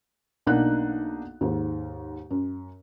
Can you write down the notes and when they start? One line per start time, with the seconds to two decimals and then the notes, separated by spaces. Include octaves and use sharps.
0.46 B1 A#3 D4 D#4 F#5 F#6
1.41 D#2 G#2
2.30 F#2